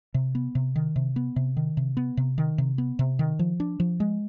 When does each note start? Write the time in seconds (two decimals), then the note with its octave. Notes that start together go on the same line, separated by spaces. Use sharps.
0.14 C3
0.35 B3
0.55 C3
0.75 D#3
0.96 C3
1.16 B3
1.36 C3
1.57 D#3
1.77 C3
1.97 B3
2.17 C3
2.38 D#3
2.58 C3
2.78 B3
2.99 C3
3.19 D#3
3.39 F3
3.60 D4
3.80 F3
4.00 G#3